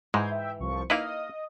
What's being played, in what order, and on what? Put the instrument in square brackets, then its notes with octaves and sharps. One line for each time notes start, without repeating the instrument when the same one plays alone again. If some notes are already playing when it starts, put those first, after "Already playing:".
[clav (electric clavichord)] G#2 G#3 [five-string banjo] E3 [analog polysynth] C6 G6 G#6
[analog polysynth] E5 G5
C2 F3 C#6
[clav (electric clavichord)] A#3 E4 B4 [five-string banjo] D#4 F5 [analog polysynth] D#5 D#6